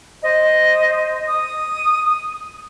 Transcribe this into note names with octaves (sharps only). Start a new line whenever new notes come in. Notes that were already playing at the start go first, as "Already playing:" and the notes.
C5 D#5
D#6